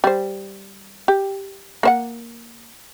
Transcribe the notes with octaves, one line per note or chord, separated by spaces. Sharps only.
G3 C5
G4
A#3 C5 F#5